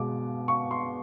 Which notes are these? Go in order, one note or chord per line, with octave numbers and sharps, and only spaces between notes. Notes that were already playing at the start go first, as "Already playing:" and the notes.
Already playing: B2 G#3 B3 D6
C#6
C6